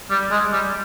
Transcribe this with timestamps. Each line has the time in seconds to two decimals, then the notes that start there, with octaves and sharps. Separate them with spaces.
0.10 G3
0.31 G#3
0.52 G3